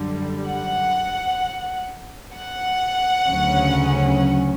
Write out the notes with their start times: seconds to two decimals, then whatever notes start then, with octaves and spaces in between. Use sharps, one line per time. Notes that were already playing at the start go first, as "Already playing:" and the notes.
Already playing: F#2 D3 G3
0.47 F#5
2.34 F#5
3.27 D2 C#3 F#3 C#4